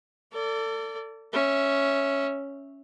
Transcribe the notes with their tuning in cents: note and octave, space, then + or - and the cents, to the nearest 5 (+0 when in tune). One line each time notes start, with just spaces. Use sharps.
A4 +30 D5 -20
C#4 +0 E5 +0